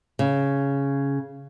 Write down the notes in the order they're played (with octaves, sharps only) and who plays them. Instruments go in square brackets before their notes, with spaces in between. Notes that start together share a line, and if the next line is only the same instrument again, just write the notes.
[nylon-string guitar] C#3